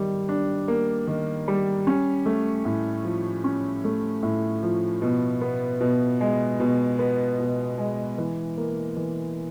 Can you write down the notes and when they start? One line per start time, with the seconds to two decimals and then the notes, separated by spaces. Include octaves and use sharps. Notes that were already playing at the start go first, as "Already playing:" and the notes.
Already playing: D#3 G3
0.29 D4
0.68 A#3
1.07 D#3
1.48 G3
1.87 C#4
2.26 A3
2.65 A2
3.05 F3
3.44 C#4
3.85 A3
4.23 A2
4.63 F3
5.02 B2
5.42 B3
5.81 B2
6.21 G#3
6.60 B2
6.99 B3
7.39 B2
7.78 G#3
8.18 E3
8.58 A#3
8.97 E3